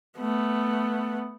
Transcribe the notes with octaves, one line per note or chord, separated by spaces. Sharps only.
A3 B3